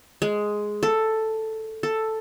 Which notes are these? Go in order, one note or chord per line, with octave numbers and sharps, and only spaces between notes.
G#3
A4
A4